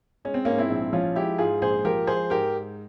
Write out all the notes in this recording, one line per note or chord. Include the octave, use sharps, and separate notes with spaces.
G#3 C#4
C4
G#2 A#3 C#4
C4 E4
A#1
F3 C#4 F4
G#3 E4 G4
G#2 F4 G#4
A#1 G#4 C5
F3 G4 A#4
G#3 G#4 C5
G#2 G4 A#4